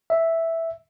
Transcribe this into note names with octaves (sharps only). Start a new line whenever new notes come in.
E5